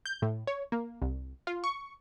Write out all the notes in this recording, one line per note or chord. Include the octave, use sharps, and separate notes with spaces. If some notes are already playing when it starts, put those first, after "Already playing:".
G6
A2
C#5
A#3
C2
F4
C#6